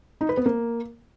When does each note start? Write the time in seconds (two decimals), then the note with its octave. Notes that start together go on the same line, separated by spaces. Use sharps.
0.21 D#4
0.29 B4
0.37 B3
0.46 A#3